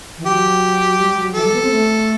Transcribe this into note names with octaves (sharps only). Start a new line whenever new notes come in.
E3
F#3 G4
G3
F#3
E3 A4
G3
B3
C4
A3